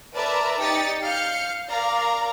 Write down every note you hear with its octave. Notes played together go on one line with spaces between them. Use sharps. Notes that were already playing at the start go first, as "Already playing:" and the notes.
A#4 B4 D5 E5 A5 A#5
D#4 G4 D5 A6 B6 C#7
F5 F6 G6 C7 C#7
A#4 D5 F5 A#5